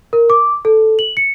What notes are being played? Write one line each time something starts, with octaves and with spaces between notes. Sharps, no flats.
A#4
D6
A4
F#7
C#7